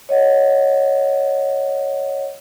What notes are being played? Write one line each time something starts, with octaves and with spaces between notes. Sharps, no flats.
C#5 D#5 F#5